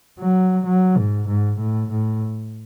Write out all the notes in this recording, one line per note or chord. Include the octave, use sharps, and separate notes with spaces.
F#3
F#3
G#2
G#2
A2
A2